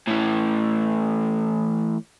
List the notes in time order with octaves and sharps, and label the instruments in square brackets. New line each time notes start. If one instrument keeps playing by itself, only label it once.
[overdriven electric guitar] A2 E3